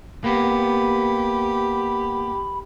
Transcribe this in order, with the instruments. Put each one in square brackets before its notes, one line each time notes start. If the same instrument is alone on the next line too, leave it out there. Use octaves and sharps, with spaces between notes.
[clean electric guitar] A#3 B3 [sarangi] G4 [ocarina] B5